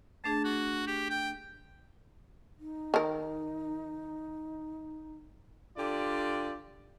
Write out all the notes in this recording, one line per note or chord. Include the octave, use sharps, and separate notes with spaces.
A3 D4 G#4 A5
F#4
G4
G5
D#4
D#3 A#4
D3 F4 G4 D5